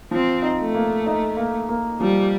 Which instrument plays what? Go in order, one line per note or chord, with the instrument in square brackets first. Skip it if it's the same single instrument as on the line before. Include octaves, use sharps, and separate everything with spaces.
[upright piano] F3 [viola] C4
[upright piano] D#4
[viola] A3
[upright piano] A#3
D#4
A#3
A#3
[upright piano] F3 [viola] G3